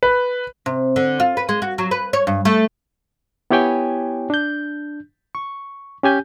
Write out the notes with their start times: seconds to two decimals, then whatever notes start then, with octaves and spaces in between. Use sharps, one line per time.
0.03 B4
0.66 C3
0.96 D3
1.20 F4
1.37 B4
1.49 G#3
1.62 F#4
1.78 F#3
1.91 B4
2.13 C#5
2.27 G2
2.45 A3
3.51 B3 E4 G4 C#5 G5 G#5
4.30 D4 G6
5.35 C#6
6.03 C#4 G4 G#5 G6